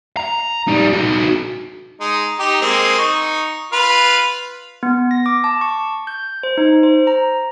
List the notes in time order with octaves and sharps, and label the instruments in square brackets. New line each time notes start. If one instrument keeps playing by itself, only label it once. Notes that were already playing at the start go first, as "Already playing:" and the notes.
[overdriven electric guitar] A#5
G3 D#4
D#4 F#4
[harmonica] G#3 D#4
D#4 G4
G#3 A#3 C4
D#4 C#6
F4 B4 F5
[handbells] B3
A#6
D6
A5
C#6
G6
C5
D#4
C5
A#5